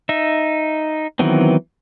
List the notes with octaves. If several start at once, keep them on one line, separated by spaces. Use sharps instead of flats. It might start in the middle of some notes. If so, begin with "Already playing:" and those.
D#4 E5
D#3 E3 F#3 B3 C4